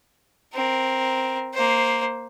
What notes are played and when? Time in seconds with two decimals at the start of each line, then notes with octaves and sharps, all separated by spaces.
0.54 C4 A#4
1.54 A#3 C5